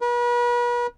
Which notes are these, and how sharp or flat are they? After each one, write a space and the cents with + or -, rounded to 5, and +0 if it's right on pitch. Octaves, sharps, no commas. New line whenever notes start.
B4 -40